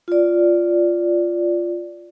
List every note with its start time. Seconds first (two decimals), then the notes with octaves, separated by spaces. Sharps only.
0.08 F4 D5